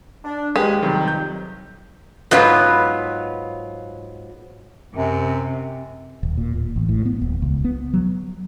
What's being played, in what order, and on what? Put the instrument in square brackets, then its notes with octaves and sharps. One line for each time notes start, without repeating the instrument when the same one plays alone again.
[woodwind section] D4
[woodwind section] D#2 G#3 [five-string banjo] G4 [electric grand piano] G#4 B4
[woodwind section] F2 F#3 [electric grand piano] C3 D#3 G3
[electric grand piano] G6
[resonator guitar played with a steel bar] G#2 F#3 B3 F4
[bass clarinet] F#2 [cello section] C3
[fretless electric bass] D#1
A#2
D1
A1
A2
B3
D#1
C#2
B3
F#3